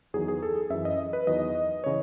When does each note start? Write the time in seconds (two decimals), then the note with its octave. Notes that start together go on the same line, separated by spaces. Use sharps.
0.14 E2 D#3 F#3 G#4
0.28 G#4
0.43 A4
0.56 G#4
0.70 F#2 E3 E5
0.85 D#5
1.13 B4
1.27 E2 D#3 F#3 D#5
1.84 C#3 E3 C#5